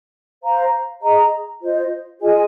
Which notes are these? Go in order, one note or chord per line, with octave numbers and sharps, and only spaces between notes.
C5 F5 A#5
G#4 D#5 A#5
F4 C5 D#5
F4 G#4 D#5 G#5